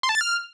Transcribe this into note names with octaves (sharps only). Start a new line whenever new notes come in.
C6
A5
A6
F6